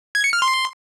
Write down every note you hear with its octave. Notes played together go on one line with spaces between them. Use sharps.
G#6
C#7
F6
C6